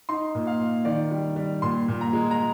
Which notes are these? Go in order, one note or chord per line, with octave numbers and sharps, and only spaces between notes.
D#4 C6
A#2
F5
A#2
D#3 D5
G3
G3
A#2 C6
A#2
A#5
G#3
A#5